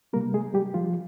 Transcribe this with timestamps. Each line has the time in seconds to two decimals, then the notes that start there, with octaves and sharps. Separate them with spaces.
0.13 C3 G3 A#3 A#4
0.34 G#3 G#4
0.54 G3 G4
0.74 F3 F4